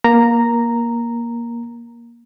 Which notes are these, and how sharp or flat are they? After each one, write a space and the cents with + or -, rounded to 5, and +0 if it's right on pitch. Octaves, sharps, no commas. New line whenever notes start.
A#3 +15 A#5 -5